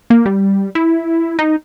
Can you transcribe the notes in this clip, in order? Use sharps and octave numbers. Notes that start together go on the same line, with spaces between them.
A#3
G3
E4
D#4